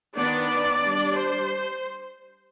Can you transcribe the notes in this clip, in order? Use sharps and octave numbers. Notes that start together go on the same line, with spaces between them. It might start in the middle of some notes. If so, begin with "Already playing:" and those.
D#3 B3 D4 D5
G3 D4
C5